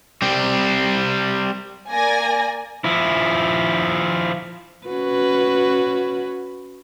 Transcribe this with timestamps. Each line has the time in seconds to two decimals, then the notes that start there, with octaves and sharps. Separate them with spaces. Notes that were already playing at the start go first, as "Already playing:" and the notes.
0.22 G3 C4
1.91 A#3 D5 G#5 A#6
2.84 F3 E4
4.87 C#4 F#4 B4